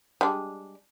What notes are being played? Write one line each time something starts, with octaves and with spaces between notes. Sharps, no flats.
G3 G#3 D4